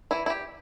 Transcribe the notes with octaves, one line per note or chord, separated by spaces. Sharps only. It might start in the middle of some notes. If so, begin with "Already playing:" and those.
E3 E4
E4
G4